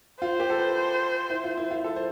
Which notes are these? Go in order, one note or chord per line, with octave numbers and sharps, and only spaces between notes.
F4 C5
G4
A4
B4
E4
F4
E4
F4
A4
C5